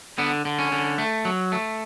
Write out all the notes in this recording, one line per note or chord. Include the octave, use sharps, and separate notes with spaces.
D3 B3
D3
C#4
D3
A3
F#3
A3